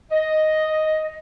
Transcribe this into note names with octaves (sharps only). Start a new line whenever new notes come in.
D#5